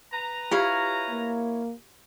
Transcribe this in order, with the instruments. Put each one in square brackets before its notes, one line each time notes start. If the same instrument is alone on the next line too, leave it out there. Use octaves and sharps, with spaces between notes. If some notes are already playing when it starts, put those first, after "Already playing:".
[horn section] B4 A#5
[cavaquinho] E4 C#5 F5 [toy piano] F4 G4
[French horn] A#3